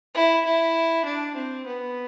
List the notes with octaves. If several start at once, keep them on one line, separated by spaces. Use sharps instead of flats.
E4
E4
D4
C4
B3